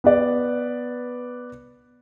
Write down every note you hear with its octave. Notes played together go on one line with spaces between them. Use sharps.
B3 B4 D5